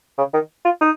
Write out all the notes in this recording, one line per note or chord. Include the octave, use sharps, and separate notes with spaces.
C#3
D#3
F4
D#4